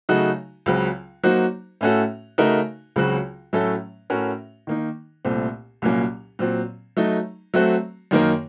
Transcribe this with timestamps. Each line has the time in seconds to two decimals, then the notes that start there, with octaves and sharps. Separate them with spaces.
0.09 C#3 F#3 A3 D#4 F#4
0.66 C#2 C#3 F#3 C4
1.23 F#3 A#3 D#4 F#4 C5
1.81 A2 A3 C#4 F#4 A4
2.38 C#3 A3 D#4 F#4 A#4
2.96 C#2 C#3 F#3 C4 F#4
3.53 A2 F#3 A3 C#4 A4
4.10 A2 A3 C#4 F#4 A#4
4.67 D#3 A#3 D#4
5.25 C2 A#2 A3 C4
5.82 C2 A#2 F#3 A#3 C#4
6.39 A#2 F#3 C4
6.97 F#3 A3 D#4
7.54 F#3 A3 C4 F#4
8.11 F#2 D#3 A#3 D#4 A#4